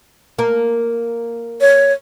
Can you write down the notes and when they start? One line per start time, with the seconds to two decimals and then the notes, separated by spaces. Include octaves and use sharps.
0.38 A#3 A#4
1.61 C#5